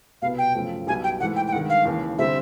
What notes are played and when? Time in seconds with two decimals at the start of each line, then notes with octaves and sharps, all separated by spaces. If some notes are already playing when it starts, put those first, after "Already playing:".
0.22 C2 B2 G3 B3 F5
0.38 G5
0.54 F#2 C#3 F3 A3
0.87 B1 B2 G3 G#5
1.04 G5
1.20 G#2 E3 A3 F#5
1.36 G5
1.47 G5
1.53 G2 D#3 G#3 F#5
1.70 F5
1.85 D#2 C#3 E3
2.18 D3 G3 C4 E5